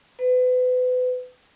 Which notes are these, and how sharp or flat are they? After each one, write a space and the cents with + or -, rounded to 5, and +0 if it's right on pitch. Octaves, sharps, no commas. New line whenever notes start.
B4 +35